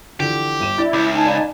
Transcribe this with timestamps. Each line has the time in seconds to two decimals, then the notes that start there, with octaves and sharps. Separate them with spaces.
0.20 D3 E3 F3 G4
0.60 G1 D#7 E7
0.78 D4 E4 A6
0.93 C#2 D6
1.14 D#4 G#5 A5
1.26 D5 F5 B5